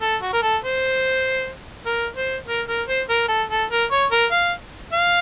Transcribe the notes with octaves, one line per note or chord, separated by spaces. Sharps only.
A4
F#4
A#4
A4
C5
A#4
C5
A#4
A#4
C5
A#4
A4
A4
A#4
C#5
A#4
F5
F5